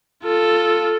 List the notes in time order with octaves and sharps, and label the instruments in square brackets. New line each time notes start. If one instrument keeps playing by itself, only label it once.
[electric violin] F4 A4